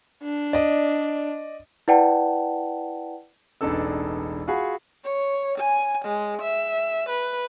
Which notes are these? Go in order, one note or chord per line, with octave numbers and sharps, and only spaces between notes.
D4
D5 D#5
E4 B4 D5 F#5 G5 A5
E1 A1 D4 D#4 A4 E6
F4 F#4 G#4 F#5 B5
C#5
G#5
G#3
E5
B4